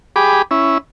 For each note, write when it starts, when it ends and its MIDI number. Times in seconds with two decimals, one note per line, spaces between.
0.16 0.42 67
0.16 0.42 68
0.16 0.42 83
0.16 0.42 86
0.51 0.78 61
0.51 0.78 64